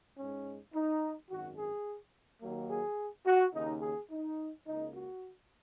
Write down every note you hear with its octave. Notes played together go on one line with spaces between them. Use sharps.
G#2 G#3 C#4
D#4
G#1 F#2 D#3 F#4
G#4
D#2 D#3 F#3 A#3
G#4
F#4
D#2 C#3 A#3 D#4
G#4
D#4
C#2 C#3 A#3 D#4
F#4